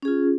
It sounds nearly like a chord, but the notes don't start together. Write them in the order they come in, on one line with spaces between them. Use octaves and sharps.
C#4 G#4 F4